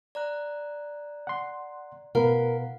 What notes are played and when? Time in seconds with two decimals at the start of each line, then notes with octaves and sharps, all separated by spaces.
0.15 D5 A#5 F#6
1.27 F#5 C6
2.15 B2 A#4 B4 F5 F#5